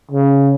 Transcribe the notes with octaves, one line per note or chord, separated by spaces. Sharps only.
C#3